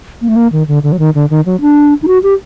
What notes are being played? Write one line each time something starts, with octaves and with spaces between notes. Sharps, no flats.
A#3
A3
A#3
D#3
D3
D3
F#3
D#3
D3
D#3
F#3
D4
D#4
F#4
G4